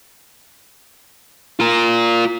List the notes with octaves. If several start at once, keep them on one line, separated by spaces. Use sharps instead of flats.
F4 A#4